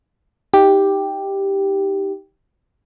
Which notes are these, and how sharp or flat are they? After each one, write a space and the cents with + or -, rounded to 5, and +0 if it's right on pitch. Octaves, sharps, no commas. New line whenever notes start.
D#4 +15 G4 +0